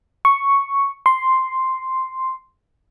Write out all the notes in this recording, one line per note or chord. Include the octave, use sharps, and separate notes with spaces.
C#6
C6